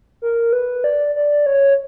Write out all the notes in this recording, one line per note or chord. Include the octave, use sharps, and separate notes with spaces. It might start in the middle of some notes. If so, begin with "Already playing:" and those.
A#4
B4
D5
D5
C#5